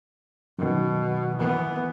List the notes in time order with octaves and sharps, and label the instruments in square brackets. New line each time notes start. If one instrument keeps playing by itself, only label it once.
[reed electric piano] F#2 D#3 [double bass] B2
[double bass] E3 B3